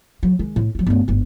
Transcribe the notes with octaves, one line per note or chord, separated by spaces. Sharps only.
F#3
D#3 G#3
A2
F3 F#3
G1 A3
G1 G#2